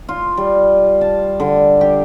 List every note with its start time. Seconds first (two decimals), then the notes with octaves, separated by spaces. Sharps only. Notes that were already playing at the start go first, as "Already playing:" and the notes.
0.09 F4
0.37 G3
1.01 A5
1.40 D3
1.81 G4